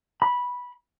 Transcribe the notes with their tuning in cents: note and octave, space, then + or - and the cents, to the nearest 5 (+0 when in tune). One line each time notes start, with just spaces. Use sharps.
B5 -10